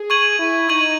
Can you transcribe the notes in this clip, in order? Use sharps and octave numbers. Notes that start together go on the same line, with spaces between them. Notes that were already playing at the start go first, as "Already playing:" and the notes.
Already playing: G#4
C#6 G#6 D#7 F#7
E4
D#4 C#6 G#6 D#7 F#7